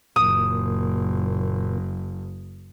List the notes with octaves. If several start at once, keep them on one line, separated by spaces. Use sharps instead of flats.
F#1 A#2 D#6